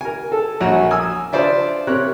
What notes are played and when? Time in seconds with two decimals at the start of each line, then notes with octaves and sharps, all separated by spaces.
0.01 A#4 G#5
0.32 A4
0.60 A#1 F#4 C#5 A#5
0.91 G#5 D#6 E6
1.33 D4 F4 C5 D5 E5
1.87 C3 A#4 C#5 F#6